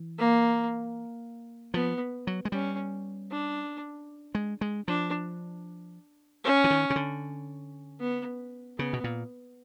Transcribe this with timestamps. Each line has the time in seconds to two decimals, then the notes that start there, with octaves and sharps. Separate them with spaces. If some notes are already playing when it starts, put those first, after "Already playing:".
Already playing: E3
0.18 A#3
1.74 F3 B3
2.27 F#3
2.45 G#3
2.52 G3 C#4
3.31 D4
4.35 G#3
4.61 G#3
4.88 F3 D4
6.44 C#4
6.64 E3
6.70 D#3
6.90 C#3
6.96 D3
8.00 B3
8.78 C#3 B3
8.93 B2
9.04 A#2